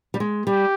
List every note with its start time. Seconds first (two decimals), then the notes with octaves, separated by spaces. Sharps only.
0.14 G3
0.20 G#3
0.46 G3 G4